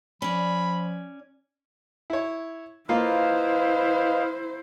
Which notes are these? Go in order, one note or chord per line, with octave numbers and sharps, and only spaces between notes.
F3 C#4 D5 B5
E4 C#5
A#3 E4 F4 B4 C5 D#5 F5